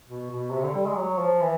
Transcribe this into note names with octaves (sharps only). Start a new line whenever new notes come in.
B2
B2
C3
D3
G3
G#3
F#3
F3
E3